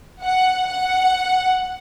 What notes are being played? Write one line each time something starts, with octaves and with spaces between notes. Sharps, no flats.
F#5
F#5